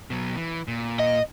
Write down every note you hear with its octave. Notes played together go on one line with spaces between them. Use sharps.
B2 F#3
E3
A#2
D#5